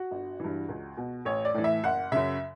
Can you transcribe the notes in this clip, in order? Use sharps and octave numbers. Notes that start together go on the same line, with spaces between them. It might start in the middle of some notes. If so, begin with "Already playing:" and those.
Already playing: F#4
G1
G2 E3
C#2
B2
A1 C#5
D5
A2 E3
E5
F#1 F#5
F#2 C#3 E5